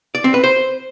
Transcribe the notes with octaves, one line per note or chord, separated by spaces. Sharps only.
D5
C4
B4
C5